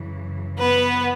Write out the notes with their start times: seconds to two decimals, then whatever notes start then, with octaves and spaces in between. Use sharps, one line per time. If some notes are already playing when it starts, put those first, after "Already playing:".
Already playing: F#2 C#3 E3
0.58 B3 B4